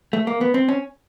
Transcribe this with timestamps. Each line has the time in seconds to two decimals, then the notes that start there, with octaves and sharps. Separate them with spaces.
0.13 A3
0.27 A#3
0.41 B3
0.54 C4
0.69 C#4